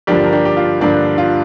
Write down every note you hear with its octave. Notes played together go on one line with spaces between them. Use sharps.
G2 D3 F3 A#3 D4 G4
A#4
D4 G4
G4
F4
G2 D3 F3 A#3 D4
F4